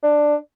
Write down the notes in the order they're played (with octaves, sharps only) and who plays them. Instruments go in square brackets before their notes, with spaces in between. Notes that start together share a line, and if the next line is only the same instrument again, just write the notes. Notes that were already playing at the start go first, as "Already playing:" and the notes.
[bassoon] D4